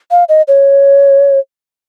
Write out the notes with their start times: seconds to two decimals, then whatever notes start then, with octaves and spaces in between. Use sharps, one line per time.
0.11 F5
0.29 D#5
0.48 C#5